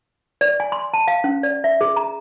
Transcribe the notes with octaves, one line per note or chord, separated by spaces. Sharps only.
D5
G#5
C6
A5
F5
C#4
D5
E5
G#4
A#5